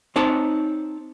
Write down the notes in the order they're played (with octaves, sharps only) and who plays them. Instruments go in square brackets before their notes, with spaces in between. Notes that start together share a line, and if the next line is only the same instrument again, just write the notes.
[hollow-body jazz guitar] C4 D#4 C#5 A5